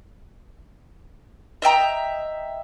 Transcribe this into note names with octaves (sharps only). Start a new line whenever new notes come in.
D#5 E5 G5 A#5